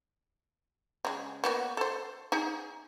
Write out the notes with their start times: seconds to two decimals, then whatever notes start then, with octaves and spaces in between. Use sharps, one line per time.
1.05 C#3 G#3
1.44 A#3 B3 F#4
1.77 A4 C5
2.32 D#4 G#4